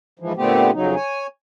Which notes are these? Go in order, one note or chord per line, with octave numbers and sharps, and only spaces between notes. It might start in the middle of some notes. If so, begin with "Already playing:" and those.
G#2 E3 F3
A#2 D3 A3 B3 C4 G4
F2 C#3 F#3 D#4
C#5 G#5